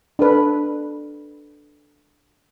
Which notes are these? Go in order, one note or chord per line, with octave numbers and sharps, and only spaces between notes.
D4 A4 B4